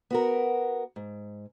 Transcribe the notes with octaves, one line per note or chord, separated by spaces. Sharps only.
B3 F#4 A#4
G#2